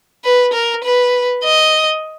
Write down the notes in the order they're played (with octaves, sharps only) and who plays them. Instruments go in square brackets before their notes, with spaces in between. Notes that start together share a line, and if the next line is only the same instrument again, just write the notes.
[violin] B4
A#4
B4
D#5